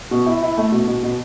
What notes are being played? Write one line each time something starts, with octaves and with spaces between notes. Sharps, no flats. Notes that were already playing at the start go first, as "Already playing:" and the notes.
B2
E4
E4
A3
B2
B2
B2